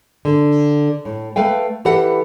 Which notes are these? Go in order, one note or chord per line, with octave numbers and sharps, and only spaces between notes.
D3
A2
A3 B4 F5 G5
E3 G4 A4 B4 F#5